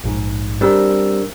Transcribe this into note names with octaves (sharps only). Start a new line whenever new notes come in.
A#1 G#2
G3 C4 D4 A#4 E6